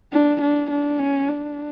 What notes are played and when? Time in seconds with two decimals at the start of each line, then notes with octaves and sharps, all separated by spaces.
0.13 D4
0.42 D4
0.70 D4
0.99 C#4
1.28 D4